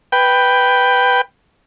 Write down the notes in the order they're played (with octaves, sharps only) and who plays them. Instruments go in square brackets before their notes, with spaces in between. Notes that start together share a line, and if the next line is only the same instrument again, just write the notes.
[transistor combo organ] B4 G5